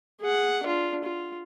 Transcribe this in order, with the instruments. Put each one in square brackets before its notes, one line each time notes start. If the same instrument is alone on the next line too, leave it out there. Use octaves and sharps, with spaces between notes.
[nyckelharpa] G#4 F#5
D4 F4
F4